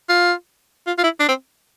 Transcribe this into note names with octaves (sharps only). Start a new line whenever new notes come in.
F4
F4
F4
E4
D4
C4